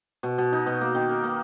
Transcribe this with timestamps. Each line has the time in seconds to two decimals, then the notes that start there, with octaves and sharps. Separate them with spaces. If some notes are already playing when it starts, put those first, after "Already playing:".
0.23 B2
0.38 B2
0.52 D#4
0.66 B2
0.81 A#3
0.95 D#3
1.09 A#4
1.23 A#3